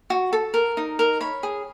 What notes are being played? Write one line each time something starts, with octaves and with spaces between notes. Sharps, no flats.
F#4
A4
A#4
D#4
A#4
C#5 B5
G#4